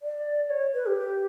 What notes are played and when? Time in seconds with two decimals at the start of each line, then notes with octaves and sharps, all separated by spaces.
0.02 D5
0.50 C#5
0.74 B4
0.86 G4